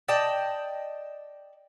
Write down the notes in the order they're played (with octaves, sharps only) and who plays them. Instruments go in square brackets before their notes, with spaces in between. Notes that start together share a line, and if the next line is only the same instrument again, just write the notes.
[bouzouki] D5 D#5 G5 A5